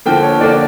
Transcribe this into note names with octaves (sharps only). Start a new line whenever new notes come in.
D3 F3 A#3 G5
C#5
D3 F3 A#3 D5